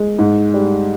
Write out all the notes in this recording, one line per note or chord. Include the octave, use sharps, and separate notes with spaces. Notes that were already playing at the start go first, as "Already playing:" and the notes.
Already playing: G#3
G#2
G3